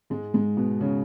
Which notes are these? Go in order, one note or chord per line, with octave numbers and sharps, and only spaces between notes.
G#2 G#3
G#2 G#3
B2 B3
C#3 C#4